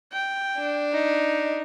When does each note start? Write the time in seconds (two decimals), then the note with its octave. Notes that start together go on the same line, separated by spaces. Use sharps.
0.13 G5
0.57 D4
0.92 D#4